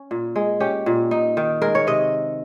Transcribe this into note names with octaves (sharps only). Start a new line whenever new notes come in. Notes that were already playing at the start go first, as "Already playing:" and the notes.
Already playing: C#4
A#2
G#3
C#4 G4
A#2
D#4
D#3
G#3 A#4
C#5
C3 D#5